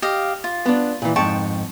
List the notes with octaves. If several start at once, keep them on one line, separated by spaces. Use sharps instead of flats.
G4 D#5 F5
F4
B3 D4
A#2 E3
F2 G#2 G5 A5 C#6